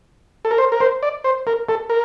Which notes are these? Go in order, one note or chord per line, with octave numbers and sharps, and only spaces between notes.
A4
A#4
C5
A#4
C5
D5
C5
A#4
A4
A#4